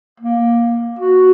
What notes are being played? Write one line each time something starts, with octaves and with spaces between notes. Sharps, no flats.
A#3
F#4